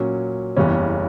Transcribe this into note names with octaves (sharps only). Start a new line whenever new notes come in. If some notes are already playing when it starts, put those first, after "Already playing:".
Already playing: A#2 F#3 C#4
F#1 E2 C#3 G3 C#4